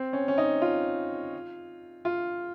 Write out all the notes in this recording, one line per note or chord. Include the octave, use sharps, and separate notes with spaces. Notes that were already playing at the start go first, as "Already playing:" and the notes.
Already playing: C4
C#4
C#4
D#4
F4
F4